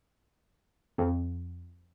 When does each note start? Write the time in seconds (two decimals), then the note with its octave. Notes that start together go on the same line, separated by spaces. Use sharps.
0.98 F2